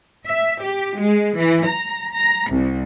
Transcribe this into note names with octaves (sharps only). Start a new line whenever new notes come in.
E5
G4
G#3
E3
A#5
A#5
C2